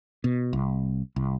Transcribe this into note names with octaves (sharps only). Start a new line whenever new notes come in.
B2
C2
C2